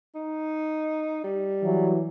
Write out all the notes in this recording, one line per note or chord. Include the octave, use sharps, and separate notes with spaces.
D#4
G3
E3 F#3